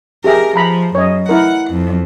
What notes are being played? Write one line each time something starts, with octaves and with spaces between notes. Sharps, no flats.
G4 G#4 A#4 E5
F3 A#5 B5
F#2 C#5 D#5
E4 A#4 F#5
F2